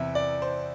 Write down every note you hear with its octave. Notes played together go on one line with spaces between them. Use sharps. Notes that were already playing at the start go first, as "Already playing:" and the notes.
Already playing: E2 C3 E3 E5
D5
C5